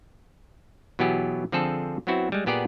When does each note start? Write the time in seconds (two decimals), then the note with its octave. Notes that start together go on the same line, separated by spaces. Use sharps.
0.99 B2 E3 F#3 B3 G4 G#4
1.52 D3 F3 C4 G#4 A4
2.07 F#3 B3 C4 E4 F#4
2.32 G3 G#3
2.46 A#2 B3 G4 G#4 D5 F#5